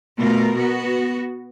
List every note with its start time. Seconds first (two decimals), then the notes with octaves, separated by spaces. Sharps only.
0.18 B2 A3 F4 A#4
0.57 B3 F#4